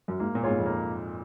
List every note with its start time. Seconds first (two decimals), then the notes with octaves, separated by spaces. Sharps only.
0.08 F#2
0.20 G#2 A#3
0.35 A#2
0.43 G#2 F4 G#4 C#5
0.51 A#2
0.58 F2
0.66 A#3